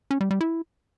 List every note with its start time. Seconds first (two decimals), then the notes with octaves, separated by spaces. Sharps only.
0.11 C#4
0.21 G3
0.31 G3
0.41 E4